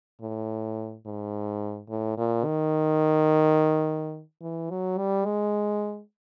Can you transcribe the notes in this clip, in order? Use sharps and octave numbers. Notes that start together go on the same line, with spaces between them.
A2
G#2
A2
A#2
D#3
E3
F#3
G3
G#3